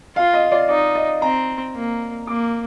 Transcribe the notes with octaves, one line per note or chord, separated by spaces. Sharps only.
F4 F5
D#5
D5
D#4 D5
D#5
C4 A#5
A#3
A#3 D6